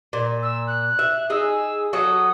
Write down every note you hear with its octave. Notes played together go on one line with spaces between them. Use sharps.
A#2
E6
F#6
E5
D#4 G#4 E6
F#3 F#4 A4 D#6